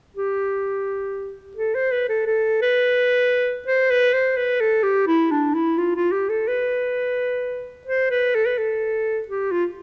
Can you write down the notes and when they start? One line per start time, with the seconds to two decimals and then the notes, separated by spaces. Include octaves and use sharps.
0.16 G4
1.57 A4
1.75 C5
1.92 B4
2.09 A4
2.26 A4
2.62 B4
3.67 C5
3.91 B4
4.14 C5
4.37 B4
4.61 A4
4.83 G4
5.07 E4
5.31 D4
5.55 E4
5.78 F4
5.96 F4
6.12 G4
6.29 A4
6.48 B4
7.87 C5
8.10 B4
8.35 A4
8.46 B4
8.58 A4
9.28 G4
9.52 F4